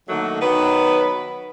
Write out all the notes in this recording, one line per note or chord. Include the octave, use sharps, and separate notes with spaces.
D3 D#3 F#3 A3 A#3
D#3 F#3 B3 B4